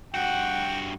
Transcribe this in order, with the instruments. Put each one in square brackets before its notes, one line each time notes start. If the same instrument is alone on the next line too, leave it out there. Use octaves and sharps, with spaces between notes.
[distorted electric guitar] G2 F#4 [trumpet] F#5 [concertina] G5